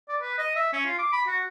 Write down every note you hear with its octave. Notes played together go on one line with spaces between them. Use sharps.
D5
B4
D#5
E5
C#4
F4
D6
B5
F#4